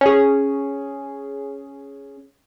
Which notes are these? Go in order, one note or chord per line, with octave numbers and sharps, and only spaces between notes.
C#4 G#4